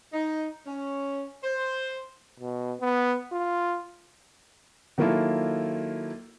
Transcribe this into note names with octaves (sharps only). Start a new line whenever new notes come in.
D#4
C#4
C5
B2
B3
F4
D#3 F#3 A#3 E4 F4 A4